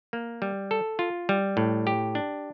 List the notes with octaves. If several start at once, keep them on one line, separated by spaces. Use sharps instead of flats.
A#3
G3
A4
F4
G3
A2
G4
D4